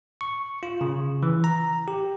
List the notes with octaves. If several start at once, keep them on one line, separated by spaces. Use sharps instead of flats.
C#6
F4
C#3
E3
A#5
G4